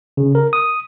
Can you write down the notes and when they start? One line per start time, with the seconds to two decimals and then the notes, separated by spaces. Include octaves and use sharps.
0.17 C#3
0.35 A#4
0.53 D#6